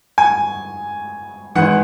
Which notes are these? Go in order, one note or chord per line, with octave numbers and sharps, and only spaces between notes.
G#5
G#1 G#2 E3 F#5